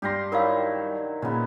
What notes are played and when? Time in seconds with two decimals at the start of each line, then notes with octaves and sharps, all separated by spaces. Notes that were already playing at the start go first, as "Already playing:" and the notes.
0.02 G2 G4 F5 C6 A#6
0.32 D#3 F#3 E4 A#4 F5
1.22 A#2 C#3 B3